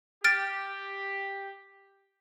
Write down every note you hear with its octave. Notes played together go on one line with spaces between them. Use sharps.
G4 F6 A6 D7